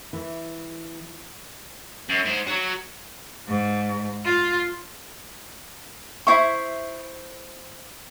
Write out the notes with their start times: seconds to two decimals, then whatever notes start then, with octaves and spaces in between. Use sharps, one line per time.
0.13 E3
2.09 F#2
2.25 G#2 C5
2.47 F#3 F#4
3.48 G#2
4.25 F4
6.27 E4 C5 E5 C#6